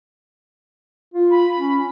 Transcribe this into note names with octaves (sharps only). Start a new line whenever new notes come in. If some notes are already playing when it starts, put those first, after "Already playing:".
F4
B5
C#4